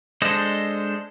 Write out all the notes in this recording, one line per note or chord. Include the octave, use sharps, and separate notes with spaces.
G#3 D4 A4 C5 D#5